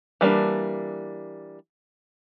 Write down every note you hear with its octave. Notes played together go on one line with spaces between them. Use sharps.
E3 G3 A#3 D4